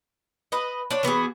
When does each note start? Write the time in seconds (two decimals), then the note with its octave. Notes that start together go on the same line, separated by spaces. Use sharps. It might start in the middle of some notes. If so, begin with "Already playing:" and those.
0.52 B4 D#5
0.91 D4 C#5 D5
1.03 E3 B3 F#4 G#4